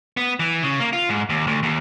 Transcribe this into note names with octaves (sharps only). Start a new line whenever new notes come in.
B3
E3
C#3
A#3
F4
G#2
D#2
D2
D#2